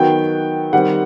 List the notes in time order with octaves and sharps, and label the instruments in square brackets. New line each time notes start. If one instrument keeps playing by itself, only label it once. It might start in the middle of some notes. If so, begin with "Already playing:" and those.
Already playing: [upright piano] D#3 F#3 B3 G5
D#3 G3 C4 F#5